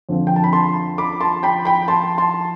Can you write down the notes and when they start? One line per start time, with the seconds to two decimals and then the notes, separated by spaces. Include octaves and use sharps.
0.09 F2 D3 F3 C4
0.27 G5
0.36 A5
0.44 B5
0.53 A5 C6
0.98 B5 D6
1.21 A5 C6
1.43 G5 B5
1.65 G5 B5
1.88 A5 C6
2.18 A5 C6